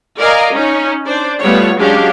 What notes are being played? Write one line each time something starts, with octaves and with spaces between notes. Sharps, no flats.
A#4 D5 D#5 F5 G#5 A#5
C#4 D#4
D4 C5 D5
G3 A3 B3 F4 C#5
F#3 G#3 C#4 D4 G4 F5